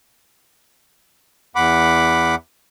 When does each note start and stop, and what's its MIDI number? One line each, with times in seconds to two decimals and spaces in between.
1.56 2.35 40
1.56 2.35 78
1.56 2.35 83
1.56 2.35 86